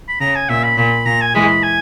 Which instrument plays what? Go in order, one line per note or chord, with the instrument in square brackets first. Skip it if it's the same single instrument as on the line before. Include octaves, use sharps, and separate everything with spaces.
[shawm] B5
[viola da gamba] C#3 [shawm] A#5
[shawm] G#5
[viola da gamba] A#2 [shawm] E5
[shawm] B5
[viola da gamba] A#2 [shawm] B5
[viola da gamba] A#2 [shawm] A#5
[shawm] G#5
[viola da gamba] E3 G#3 [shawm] B5
[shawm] G#5